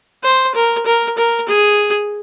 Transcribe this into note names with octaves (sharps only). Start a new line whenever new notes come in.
C5
A#4
A#4
A#4
G#4